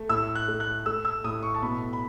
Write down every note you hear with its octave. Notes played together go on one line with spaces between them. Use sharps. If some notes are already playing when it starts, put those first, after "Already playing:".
Already playing: A3
A2 E6
F#6
A3
F#6
A3 E6
E6
A2 D#6
C#6
A5
B2 B5
B5